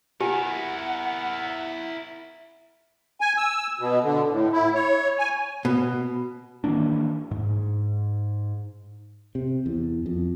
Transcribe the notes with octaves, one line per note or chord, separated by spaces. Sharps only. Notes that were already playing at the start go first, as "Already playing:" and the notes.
E4 G4 A#4 F#5 G#5
G#5
E6
B2
D3
A2
E4
C#5
G#5
B2
D#3 E3 A#3 D4
G#2
C3
E2
F2